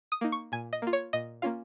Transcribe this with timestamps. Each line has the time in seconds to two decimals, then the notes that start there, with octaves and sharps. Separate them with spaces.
0.12 D#6
0.21 A#3 D#4
0.32 C#6
0.52 A#2 G#5
0.73 D#5
0.82 A#3 F4
0.93 C#5
1.13 A#2 D#5
1.42 A#3 C#4 F4 F5